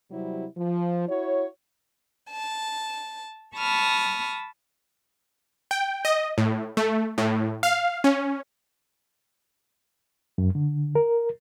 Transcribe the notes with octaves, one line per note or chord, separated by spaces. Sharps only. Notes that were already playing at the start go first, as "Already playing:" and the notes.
C3 F#3 G3 C4 E4
F3
E4 F#4 C#5
A5
A5 B5 C#6 D#6 F6
G5
D#5
A2
A3
A2
F5
C#4
F#2
D3
A#4